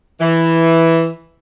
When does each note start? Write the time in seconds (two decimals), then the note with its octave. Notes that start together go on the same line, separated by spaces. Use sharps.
0.20 E3